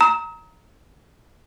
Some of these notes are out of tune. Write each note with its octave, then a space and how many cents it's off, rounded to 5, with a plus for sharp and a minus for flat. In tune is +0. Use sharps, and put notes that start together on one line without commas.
A#5 +0 D#6 +45